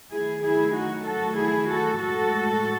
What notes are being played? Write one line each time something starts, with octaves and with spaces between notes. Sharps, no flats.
D#3 F#3 A3 E4 G#4
E4 G#4
D#4 F#4
F#4 A4
E4 G#4
F#4 A4
A2 G#3 F#4 A4